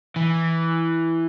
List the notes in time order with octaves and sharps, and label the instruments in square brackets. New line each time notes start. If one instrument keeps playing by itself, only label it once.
[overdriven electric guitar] E3